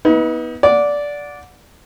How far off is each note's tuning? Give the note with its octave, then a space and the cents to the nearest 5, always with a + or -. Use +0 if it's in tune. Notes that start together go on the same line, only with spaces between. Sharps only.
B3 -15 D#4 +45
D5 -10 F#5 -25